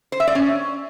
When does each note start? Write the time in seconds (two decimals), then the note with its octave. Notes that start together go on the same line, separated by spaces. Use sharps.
0.12 C5
0.20 E5
0.27 D5
0.35 C#4